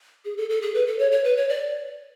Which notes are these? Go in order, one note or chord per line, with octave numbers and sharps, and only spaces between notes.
G#4
A4
A4
G#4
B4
A4
C#5
C#5
B4
C#5
D5